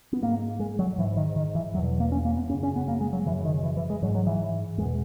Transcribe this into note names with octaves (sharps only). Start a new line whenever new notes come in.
B3
G#2 A#3
G#3
F#3
G#2 E3
D#3
D#3
E3
E2 B2 F#3
A#3
C#4
A#3
B3
F#2 C#3 C#4
C#4
B3
A#3
G#3
F#3
F#2 C#3 E3
D#3
E3
E3
G#3
G#2 F#3
F#3
E3
E2 B2 G#3